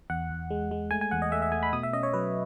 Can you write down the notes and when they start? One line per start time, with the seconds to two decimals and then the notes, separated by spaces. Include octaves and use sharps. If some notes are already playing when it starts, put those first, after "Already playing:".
0.10 E2 F#5
0.30 E2
0.50 G#3
0.71 G#3
0.91 A3 G#5
1.01 G#5
1.11 E2 F#5
1.22 D#5
1.32 A3 E5
1.42 E5
1.52 A3 G#5
1.63 B5
1.73 B2 D#6
1.83 E5
1.93 C#4 D#5
2.03 C#5
2.13 F#3 B4